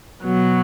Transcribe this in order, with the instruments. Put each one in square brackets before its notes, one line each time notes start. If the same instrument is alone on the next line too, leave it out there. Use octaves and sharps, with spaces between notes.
[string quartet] B2 F#3 B3